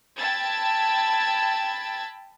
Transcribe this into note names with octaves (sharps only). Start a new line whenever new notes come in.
G5 A5 B5 E6 G#6 A6